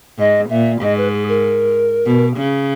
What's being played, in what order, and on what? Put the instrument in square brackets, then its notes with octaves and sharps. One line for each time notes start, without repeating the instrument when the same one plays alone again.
[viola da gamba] G#2 [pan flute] D#5
[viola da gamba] A#2 [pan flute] E5
[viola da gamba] G#2 [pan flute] D#5
[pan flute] B4
G#4
A#4
[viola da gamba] B2
C#3